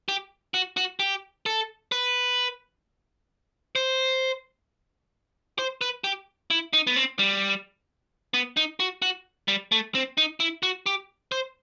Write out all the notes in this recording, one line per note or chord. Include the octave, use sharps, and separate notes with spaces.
G4
F#4
F#4
G4
A4
B4
C5
C5
B4
G4
E4
D#4
B3
C4
G3
B3
D#4
F#4
F#4
G3
A3
C4
D#4
E4
F#4
G4
C5